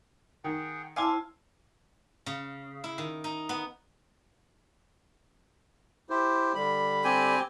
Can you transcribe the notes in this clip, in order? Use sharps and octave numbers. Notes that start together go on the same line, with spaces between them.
D#3 G#4 F#5 G5
C4 E4 F5 G#5 A5 D6 E6
C#3
E4
D#3
D#4
B3
E4 G4 C5
D3 G3 B5
C4 G4 G#5